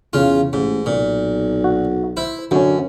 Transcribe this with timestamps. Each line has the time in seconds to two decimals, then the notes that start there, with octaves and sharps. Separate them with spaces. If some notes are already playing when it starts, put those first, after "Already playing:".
0.13 E2 C#3 F4
0.53 A1 G#2
0.86 B1 A#2
1.64 F#4
2.17 E4 C5
2.51 F#2 D3 F#3 C#4